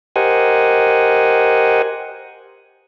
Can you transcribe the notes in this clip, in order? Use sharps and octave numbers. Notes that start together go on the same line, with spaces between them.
G4 A#4 C5 D#5 F#5 G#5